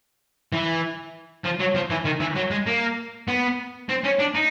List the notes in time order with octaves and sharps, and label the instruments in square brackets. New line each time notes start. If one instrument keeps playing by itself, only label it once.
[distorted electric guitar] E3
F3
F#3
F3
E3
D#3
E3
F#3
G#3
A#3
B3
C4
C#4
D4
D#4